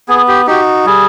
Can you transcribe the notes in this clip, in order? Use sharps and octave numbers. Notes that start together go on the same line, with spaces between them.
B3 G#4
G4
D#4 F#4 G4
G3 G#4